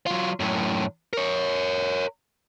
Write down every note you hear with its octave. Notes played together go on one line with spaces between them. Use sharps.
F#3 F4
F#2 A2
A#4 C#5